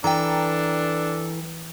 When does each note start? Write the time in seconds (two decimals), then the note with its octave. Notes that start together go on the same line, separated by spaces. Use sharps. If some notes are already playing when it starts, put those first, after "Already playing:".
0.04 E3 D4 A4 G5 A#5